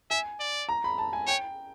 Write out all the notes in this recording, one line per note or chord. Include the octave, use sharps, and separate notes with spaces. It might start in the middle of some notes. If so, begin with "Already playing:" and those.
E5 G#5
D5
A#5
B5
A5
G#5
C#5 G5